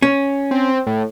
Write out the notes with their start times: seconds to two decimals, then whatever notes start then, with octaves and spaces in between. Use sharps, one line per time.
0.02 C#4
0.51 C4
0.87 A2